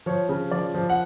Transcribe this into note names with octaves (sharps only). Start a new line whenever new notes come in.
F3 C#5
C#3
F3 D5
F3
F#5